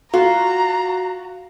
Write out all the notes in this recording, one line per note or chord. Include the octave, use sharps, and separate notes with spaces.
F4 F#4 A#5